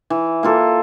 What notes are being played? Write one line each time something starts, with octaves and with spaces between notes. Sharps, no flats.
E3
A#3 F4 A4